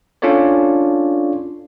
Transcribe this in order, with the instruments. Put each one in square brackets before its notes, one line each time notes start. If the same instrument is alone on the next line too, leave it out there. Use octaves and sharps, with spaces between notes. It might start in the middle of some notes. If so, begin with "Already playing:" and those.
[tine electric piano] C#4 D4 F4 A4 C#5 D5